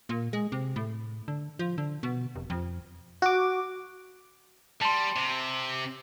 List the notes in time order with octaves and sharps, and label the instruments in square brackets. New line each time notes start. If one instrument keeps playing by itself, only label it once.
[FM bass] A#2
G#3
C3
A2
D3
F3
D3
B2
F1
F2
[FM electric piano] F#4 D6
[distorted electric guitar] G3 [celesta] A5 C6
[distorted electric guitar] C3